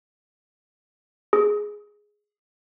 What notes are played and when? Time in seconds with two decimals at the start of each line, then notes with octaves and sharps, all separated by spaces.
1.33 G#4